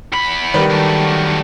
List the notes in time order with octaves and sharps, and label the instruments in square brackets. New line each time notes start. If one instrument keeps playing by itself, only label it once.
[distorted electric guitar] E2 B5
[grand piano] D#3 G3 B4
[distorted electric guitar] F#3 A3